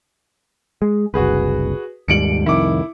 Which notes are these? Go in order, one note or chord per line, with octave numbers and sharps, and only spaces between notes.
G#3
F#1 C2 F#4 G#4 B4
D#2 G#2 G3 C#7 D7 F#7
C2 F2 D#3 E4 D6